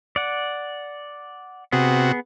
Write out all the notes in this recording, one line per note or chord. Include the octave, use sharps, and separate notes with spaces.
D5 F#5
C3 B3 F#4 G#4